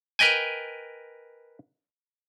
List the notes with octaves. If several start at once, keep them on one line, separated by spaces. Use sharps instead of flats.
A#4 B4 D#5 G5 G#5